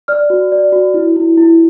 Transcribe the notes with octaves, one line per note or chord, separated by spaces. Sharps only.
D5 F6
F#4
D5
F#4
E4
E4
E4